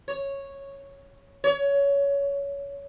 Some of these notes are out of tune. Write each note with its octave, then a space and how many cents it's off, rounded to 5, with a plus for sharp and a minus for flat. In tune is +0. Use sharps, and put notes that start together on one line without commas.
C#5 -5
C#5 +20